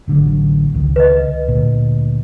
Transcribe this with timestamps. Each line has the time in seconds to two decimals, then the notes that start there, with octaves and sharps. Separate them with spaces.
0.08 A1 D3 F#3
0.75 C#2 D#3
0.96 B4 D#5
1.48 D2 A#2